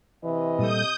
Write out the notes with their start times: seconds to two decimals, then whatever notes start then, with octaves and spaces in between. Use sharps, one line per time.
0.24 C3 E3 D#5
0.59 A#2 G3 A4 D#6 G6